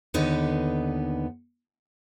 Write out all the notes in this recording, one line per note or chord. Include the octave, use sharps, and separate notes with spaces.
D#2 D3 B3 D#4 B4